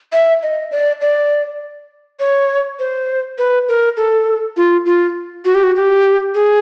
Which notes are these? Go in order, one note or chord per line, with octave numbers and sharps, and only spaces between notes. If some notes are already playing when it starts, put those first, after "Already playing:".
E5
D#5
D5
D5
C#5
C5
B4
A#4
A4
F4
F4
F#4
G4
F#4
G4
G#4